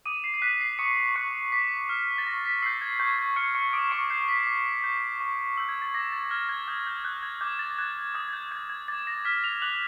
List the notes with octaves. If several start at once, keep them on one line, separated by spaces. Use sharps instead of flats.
D6 D#6 D#7
C7
C7
F#6 B6
C7
C#6 D#6 C#7
C#6 F#6 C#7
D6 B6
F6
A6
C#6 A#6
B6
E6 G6 C7
G#6
C#6 G6
G#6
C#6 F6 C#7
C#6 C#7
D6 D#6 D7
C#6 C#7
G6 C7
B6
D6
G6
C#6
E6 G6
G#6
A6
D6 A#6
A6
F6 G#6
G#6
D#6 G6
G6
F#6 G6
G#6
D6 G6
A6
A6
F#6 G#6
D#6 G#6
G#6
G6
G6 G#6
G#6
D6 A6
A#6
F6 B6
F6 F7
D6 F#6 F#7